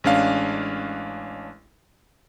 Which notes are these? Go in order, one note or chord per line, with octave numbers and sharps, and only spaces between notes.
A1 G#3 C#4 D4 F5